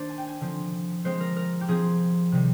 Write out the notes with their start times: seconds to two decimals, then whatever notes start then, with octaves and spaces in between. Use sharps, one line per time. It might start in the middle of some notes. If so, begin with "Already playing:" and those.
Already playing: D#3 A#3 D4 C5 D5
0.09 G#5
0.18 G5
0.27 G#5
0.41 D3 F3 C4
1.04 F3 G#3 C4 C5
1.20 A#4
1.36 A#4
1.61 G4
1.68 F3 C4 G#4
2.32 C3 D#3 G3